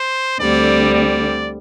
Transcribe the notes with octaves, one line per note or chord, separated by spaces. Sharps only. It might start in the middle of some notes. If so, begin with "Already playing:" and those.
Already playing: C5
D2 D3 G3 C4 D5
D5